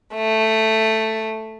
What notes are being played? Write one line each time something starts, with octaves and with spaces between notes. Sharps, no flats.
A3